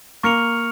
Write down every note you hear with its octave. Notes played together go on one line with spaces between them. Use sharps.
A#3 C#6 F6 C#7 F7